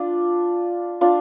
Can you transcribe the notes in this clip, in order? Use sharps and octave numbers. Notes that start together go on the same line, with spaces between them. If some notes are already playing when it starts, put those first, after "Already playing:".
Already playing: D4 F4
D4 F4